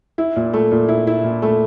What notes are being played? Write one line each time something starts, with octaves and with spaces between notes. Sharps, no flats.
E4
A#2
A3
A#2
E4
E4
A#2
A3